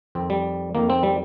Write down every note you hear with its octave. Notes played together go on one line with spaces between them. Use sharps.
F2 D#3 C4
G3
F2 D#3 A#3
C4
G3